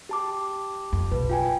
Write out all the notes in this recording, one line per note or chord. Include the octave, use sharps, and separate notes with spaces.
G4 A5 D6
F2
B1 B4
F4 G5 G#5